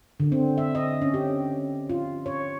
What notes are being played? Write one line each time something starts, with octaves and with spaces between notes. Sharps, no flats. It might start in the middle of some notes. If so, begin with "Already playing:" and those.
D3
C4
E5
D#5
C#4
G4
F4
C#5